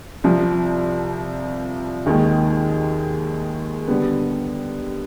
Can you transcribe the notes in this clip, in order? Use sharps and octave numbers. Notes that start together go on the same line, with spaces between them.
C2 C3 F3
D#2 D#3 G#3
D3 G3 B3